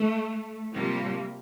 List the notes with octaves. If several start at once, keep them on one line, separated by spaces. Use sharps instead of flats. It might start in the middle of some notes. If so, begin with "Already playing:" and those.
Already playing: A3
C3 F3 G3 A#3